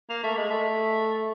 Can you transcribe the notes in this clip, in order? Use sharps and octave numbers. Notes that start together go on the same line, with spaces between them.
A#3
A3
G#3
A3